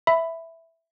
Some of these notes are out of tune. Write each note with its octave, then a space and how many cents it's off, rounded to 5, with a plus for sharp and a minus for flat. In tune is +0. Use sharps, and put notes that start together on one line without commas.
E5 +0 B5 +10